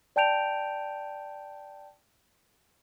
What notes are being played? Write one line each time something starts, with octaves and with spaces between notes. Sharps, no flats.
D5 G5 A5 G6 D7 F7